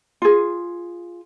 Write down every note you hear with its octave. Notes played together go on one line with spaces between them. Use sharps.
F4 G#4